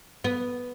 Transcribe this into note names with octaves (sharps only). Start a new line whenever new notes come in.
B3